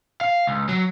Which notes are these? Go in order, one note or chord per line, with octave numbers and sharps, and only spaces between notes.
F5
C#2
F#3